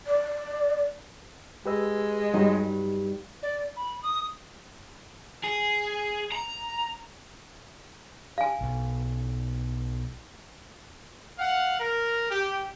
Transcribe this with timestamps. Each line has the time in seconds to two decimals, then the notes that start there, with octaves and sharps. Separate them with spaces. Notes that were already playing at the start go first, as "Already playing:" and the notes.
0.07 D5
1.66 G#3 G4 B4 E6
2.34 G2 F#3 D#4
3.43 D5
3.77 B5
4.03 D#6
5.44 G#4
6.32 A#5
8.38 F5 G#5
8.61 B1
11.39 F5 F#5
11.78 A#4
12.30 G4